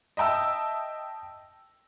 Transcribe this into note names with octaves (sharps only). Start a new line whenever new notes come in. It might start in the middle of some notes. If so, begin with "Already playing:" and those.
D#5 E5 G5 A5 E6